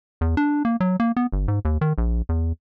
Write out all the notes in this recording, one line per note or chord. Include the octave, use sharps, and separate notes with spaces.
E2
D4
A#3
F#3
A#3
B3
G1
G#2
D#2
D#3
A#1
E2